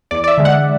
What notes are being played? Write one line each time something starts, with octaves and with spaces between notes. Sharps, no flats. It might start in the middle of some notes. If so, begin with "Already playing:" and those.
E2 D5
D5
E5
D3 G#3
F#5